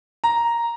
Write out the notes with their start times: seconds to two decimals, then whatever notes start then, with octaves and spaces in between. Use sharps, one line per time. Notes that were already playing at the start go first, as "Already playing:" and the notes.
0.24 A#5